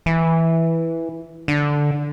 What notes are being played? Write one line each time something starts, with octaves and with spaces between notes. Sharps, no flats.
E3
D3